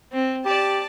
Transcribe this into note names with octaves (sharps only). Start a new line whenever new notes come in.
C4
G4 D5 A5